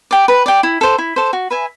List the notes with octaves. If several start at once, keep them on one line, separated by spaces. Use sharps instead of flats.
D5 G5
B4
D5 G5
E4
A4 C5
E4
A4 C5
F#4
B4 E5 G#5